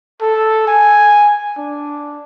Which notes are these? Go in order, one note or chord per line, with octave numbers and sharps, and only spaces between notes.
A4
G#5
D4